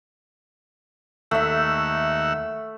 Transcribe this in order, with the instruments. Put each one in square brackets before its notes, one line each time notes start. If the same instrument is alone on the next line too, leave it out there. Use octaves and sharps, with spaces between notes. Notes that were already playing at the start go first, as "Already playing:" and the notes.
[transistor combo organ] D#2 F#5 E6 [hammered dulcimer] A3 E5